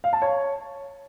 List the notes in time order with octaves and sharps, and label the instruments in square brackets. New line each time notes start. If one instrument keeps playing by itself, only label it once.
[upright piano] F5
A5
C#5